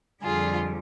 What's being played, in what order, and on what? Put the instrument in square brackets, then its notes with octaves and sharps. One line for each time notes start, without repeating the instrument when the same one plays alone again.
[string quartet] F2 D3 G3 F4 G#4